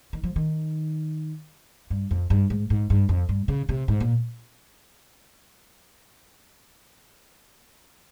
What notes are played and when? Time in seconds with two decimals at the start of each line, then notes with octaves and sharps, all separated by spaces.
0.13 D#3
0.23 F3
0.36 D#3
1.90 G2
2.11 F2
2.30 G2
2.50 G#2
2.70 G#2
2.90 G2
3.09 F2
3.29 G2
3.48 C#3
3.69 C3
3.88 G#2
4.00 A#2